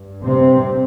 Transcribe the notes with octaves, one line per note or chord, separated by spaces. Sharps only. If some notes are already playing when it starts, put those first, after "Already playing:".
Already playing: G2
C3 C4